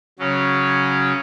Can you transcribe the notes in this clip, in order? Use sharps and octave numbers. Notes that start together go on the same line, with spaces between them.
C#3 F#3 C#4